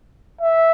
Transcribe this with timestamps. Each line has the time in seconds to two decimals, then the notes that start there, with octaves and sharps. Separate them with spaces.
0.41 E5